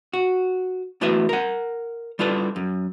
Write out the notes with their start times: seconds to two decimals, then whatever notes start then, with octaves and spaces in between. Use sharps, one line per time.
0.13 F#4
1.01 E2 A3 E4 F#4 B4 E5
1.29 A#4 F#5
2.19 G3 E4 F4 A4 B4
2.56 F#2